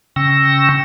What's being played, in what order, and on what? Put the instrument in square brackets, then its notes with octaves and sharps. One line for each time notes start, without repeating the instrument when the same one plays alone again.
[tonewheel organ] C#3 G5 C#6 E6 A#6